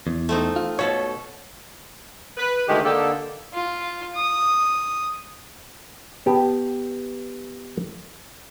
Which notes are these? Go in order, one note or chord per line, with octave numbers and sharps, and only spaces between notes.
E2
A3 C4 D#4
F4
B2 A4 C#5
B4
D2 D#3 G#3 G4
D3 A#3 D#4 G4 A4
F4
D#6
B3 G4 A5